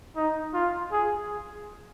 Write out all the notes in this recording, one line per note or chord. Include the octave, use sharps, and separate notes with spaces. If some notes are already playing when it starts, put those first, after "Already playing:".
D#4
F4
G#4